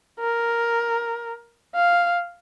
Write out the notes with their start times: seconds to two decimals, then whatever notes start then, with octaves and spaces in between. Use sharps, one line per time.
0.20 A#4
1.74 F5